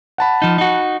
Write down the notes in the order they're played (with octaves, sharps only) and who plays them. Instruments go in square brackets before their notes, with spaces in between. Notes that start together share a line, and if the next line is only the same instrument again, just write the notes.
[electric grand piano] F#5 A5 B5
[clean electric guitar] F3 D#4
D#4 F#4